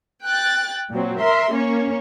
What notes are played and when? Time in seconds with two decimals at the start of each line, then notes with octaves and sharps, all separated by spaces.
0.24 G5 F#6 A6
0.91 A#2 F#3 C4
1.20 A#4 E5 C6
1.52 A#3 C#4 C#5